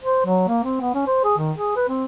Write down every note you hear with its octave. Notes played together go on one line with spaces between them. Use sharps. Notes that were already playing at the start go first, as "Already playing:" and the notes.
C5
F#3
A#3
C4
B3
C#4
C5
G#4
D#3
G#4
B4
C4